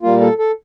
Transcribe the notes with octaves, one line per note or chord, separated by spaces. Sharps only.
A#2 G3 A#3 F4
A4
A4